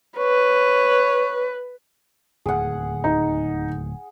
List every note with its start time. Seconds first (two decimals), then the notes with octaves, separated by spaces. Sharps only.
0.18 B4 C#5
2.46 D1 D#2 G#4 F#5
3.04 D#4